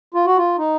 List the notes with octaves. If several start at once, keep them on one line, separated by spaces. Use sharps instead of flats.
F4
F#4
F4
D#4